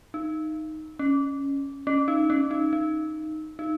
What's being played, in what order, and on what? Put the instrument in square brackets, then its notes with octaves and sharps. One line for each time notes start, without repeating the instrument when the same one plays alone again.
[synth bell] D#4
C#4
C#4
D#4
C#4
D#4
D#4
D#4